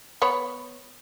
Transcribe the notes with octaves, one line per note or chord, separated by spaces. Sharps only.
B3 C#5 B5